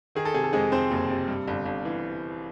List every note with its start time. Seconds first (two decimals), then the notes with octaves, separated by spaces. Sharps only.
0.15 D#3 G#4
0.25 A4
0.34 C3 G#4
0.44 A4
0.53 F2 G#3 G#4
0.72 F2 C4 C5
0.91 F#1
1.10 C3
1.28 G2
1.48 G1
1.66 G1
1.85 E3